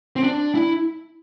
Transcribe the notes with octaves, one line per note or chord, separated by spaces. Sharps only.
C4
D4
E4